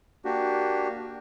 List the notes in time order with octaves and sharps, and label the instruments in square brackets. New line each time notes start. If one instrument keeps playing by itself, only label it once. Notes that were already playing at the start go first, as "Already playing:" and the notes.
[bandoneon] A#3 D4 F#4 G4